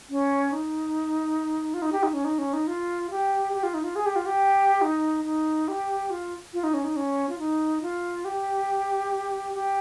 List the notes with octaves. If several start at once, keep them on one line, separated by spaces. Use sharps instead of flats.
C#4
D#4
F4
D#4
G4
D#4
C#4
D#4
C#4
D#4
F4
G4
G4
F4
D#4
F4
G#4
G4
F4
G4
D#4
D#4
G4
F4
F4
D#4
C#4
D#4
C#4
F4
D#4
F4
G4
G4